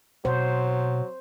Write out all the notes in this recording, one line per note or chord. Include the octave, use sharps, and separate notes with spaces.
B2 F#3 C5